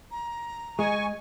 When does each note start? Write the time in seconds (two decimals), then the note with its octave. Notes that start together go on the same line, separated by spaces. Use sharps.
0.11 A#5
0.79 G#3 G#4 D#5 G#5 C#6